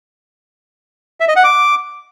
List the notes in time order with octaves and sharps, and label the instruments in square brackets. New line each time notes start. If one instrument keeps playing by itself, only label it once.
[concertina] E5
D#5
F#5
D6